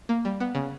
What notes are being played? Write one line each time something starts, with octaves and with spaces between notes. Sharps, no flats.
A#3
G3
B3
C#3